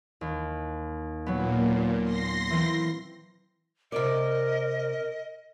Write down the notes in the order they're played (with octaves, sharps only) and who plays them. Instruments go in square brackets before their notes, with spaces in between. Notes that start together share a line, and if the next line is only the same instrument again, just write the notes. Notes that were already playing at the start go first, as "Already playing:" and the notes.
[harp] D#2
[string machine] A#2 [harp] F#3 B3
[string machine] C6 A#6
[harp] E3 A#3 C4
[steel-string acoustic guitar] C3 D5 [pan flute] A#4 [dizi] D#5